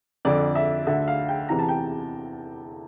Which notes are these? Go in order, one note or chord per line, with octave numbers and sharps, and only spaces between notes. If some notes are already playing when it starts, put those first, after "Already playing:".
F2 D3 D5
E5
D2 D3 E5
F5
G5
E2 C3 E3 A#5
A5
G5